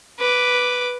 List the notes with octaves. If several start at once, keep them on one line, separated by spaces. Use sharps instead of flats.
B4 D6